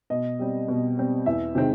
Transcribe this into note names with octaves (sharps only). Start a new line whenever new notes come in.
B2 D#5
G3 C4
B2
G3 C4
E2 E5
C3 D#3 G#3 C4